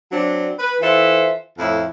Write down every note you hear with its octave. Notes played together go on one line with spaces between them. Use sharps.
F#3 C4 D4
B4
E3 F4 A4 C5 E5
F2 A2 E4